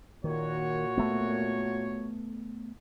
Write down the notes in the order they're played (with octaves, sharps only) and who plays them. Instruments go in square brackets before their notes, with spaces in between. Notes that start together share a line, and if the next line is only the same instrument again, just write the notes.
[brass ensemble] A#2 F#4 C#5 [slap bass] D#3
[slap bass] A3 B3